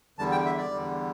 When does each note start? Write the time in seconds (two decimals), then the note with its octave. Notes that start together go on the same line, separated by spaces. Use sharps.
0.19 E2 D3 G3 A5
0.32 G5
0.46 E5
0.58 D5
0.71 E2 D3 G3